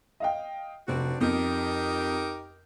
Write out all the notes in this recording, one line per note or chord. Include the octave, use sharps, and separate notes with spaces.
D#5 F5 G5
F1 C4 D4 F#4
F2 D#4 G4 A#4